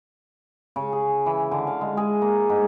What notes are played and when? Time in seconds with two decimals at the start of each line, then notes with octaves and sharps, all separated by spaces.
0.76 C#3
0.93 G#4
1.26 E3
1.51 D3
1.67 F5
1.81 G#3
1.97 G#4
2.22 A#3
2.49 G#2